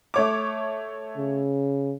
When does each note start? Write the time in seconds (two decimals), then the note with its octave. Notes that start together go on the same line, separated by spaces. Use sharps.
0.14 A3 C#5 D6
1.18 C#3